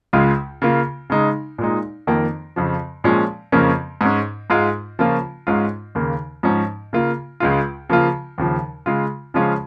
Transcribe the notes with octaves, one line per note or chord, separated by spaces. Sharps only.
C#2 C#3 G#3 F4
C#3 A#3 F4
C#3 G#3 D#4
A#2 G#3 D#4
F2 D#3 A#3
F2 C#3 F3
A#2 F3 G#3 C#4
F2 C#3 F3 A#3 C#4
G#2 G#3 C#4
G#2 G#3 F4
C#3 F3 A#3 C#4 F4
G#2 G#3 C#4 F4
D#2 C#3 A#3
G#2 F3 C#4
C#3 A#3 F4
C#2 C#3 G#3 F4
C#3 F3 A#3 F4
D#2 C#3 F3
C#3 G#3 F4
C#3 F3 G#3 C#4 F4